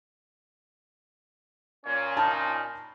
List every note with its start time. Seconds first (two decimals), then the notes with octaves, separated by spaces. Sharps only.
1.85 A#2 C#4 C#5
2.17 D#4 A5 B5 F6